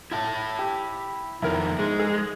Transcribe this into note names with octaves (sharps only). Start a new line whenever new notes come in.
E4 E5 A5
G4
F2 D#3 E4 A#4
G#2 G#3
G#4